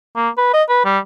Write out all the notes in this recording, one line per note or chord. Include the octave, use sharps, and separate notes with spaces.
A#3
B4
D#5
B4
G3